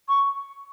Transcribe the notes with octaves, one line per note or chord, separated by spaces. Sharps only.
C#6